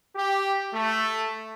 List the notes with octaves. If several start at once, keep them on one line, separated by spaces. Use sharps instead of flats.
G4
A3